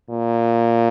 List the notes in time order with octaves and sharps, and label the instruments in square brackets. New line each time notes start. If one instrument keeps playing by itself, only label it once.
[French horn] A#2